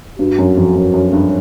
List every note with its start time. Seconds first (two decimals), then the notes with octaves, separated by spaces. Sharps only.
0.19 G2 F#4
0.38 F#2
0.57 F2
0.76 F#2
0.94 F#2
1.13 G2